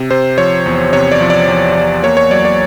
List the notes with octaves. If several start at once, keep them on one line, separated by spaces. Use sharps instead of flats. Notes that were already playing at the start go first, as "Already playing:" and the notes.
Already playing: C3
C3 C5
F3 C#5
E2
C3 C#5
D5
F3
D5
E2
E2
A#3 C#5
C#5
F#3 D5
D5